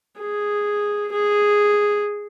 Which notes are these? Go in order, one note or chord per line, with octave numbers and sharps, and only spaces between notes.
G#4
G#4